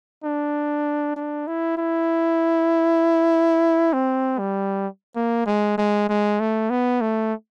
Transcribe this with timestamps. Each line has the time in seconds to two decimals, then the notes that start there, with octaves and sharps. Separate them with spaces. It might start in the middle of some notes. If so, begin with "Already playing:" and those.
0.24 D4
1.16 D4
1.47 E4
1.77 E4
3.93 C4
4.39 G3
5.16 A#3
5.46 G#3
5.78 G#3
6.09 G#3
6.40 A3
6.70 B3
7.01 A3